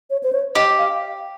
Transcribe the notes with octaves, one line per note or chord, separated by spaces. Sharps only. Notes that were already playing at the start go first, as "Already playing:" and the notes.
C#5
C5
C#5
G4 D#5
F5